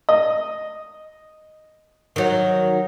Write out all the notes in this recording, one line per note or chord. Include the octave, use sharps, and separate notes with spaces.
D#5
D#3 F#3